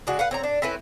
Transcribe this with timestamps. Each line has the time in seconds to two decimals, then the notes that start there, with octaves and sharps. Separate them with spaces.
0.07 C#3 G#3 D4 F#4
0.19 B4 F5 F#5
0.31 C4 C#5 A#5
0.44 D4
0.62 C4 C#4 E4 B4